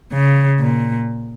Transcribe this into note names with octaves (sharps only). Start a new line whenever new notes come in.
C#3
A#2